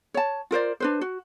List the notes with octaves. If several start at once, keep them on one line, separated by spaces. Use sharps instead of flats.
C#5 A5
F4 A#4 C5 D5
D4 B4 C5
F#4